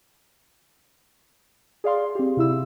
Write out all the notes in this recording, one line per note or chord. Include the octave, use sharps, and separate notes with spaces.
G#4 D5 F5 C6
C4 G4
C3 E4 E6